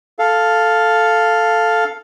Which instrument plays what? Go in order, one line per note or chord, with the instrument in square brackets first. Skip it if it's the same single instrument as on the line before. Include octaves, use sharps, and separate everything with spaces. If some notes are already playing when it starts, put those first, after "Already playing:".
[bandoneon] A4 F5